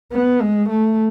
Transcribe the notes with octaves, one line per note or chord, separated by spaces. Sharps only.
B3
G#3
A3